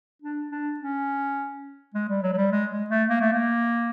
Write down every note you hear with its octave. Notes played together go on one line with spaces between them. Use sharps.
D4
D4
C#4
G#3
G3
F#3
F#3
G3
G#3
G#3
A3
A#3
A3
A#3